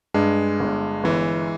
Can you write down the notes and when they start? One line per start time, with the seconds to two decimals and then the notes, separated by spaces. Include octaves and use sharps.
0.14 G2 G#3
0.60 G1
1.04 G1 E3